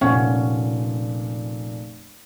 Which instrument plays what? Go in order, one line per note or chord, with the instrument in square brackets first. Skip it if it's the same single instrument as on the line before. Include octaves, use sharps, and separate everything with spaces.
[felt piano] F1 A#2 [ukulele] C#4 F#5